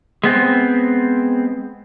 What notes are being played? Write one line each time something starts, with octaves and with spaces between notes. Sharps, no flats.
G#3 B3 C4